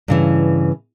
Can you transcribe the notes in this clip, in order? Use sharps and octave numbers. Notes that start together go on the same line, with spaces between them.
G2 C#3 E3